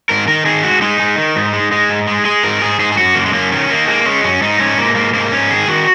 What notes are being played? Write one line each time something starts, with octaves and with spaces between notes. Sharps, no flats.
G#2 A#4
D#3 A#4
D#3 G#4
G#3 F#4
G#3 D#4
G#3
D#3
G#2
G#3
G#3
G#2
G#3
G#3 G#4
G#2 A#4
G#2 G#4
G#2 G#4
G#4
F#2 F#4
F#2 A#3
G#3
F#2 A#3
D#3 C#4
D#3 A#3
G#3 A#3
G#3 C#4
F#2 C#4
G#2 D#4
G#2 C#4
G#2 A#3
G#2 A#3
G#2 A#3
G#2 C#4
D#3 G#4
D#3 F#4